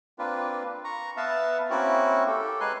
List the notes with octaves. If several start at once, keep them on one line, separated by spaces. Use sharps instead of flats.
A#3 C4 D4 F4 B4
A#5 C#6
B3 B4 E5 F5 A5
A#3 C4 C#4 E4 F#4
G4 A4
G#3 A#4 B4 G#5 C6 F#6